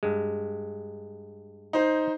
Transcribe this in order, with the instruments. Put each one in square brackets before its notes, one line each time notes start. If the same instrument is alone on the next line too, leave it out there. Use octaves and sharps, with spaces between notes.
[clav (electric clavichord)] G2 G#3
[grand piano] D#4 C5